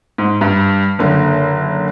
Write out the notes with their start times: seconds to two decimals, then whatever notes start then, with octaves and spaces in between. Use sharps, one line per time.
0.18 G#2
0.41 G2
0.99 F#1 D3